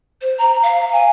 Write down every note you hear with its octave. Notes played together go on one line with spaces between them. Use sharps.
C5
A#5
F5
G#5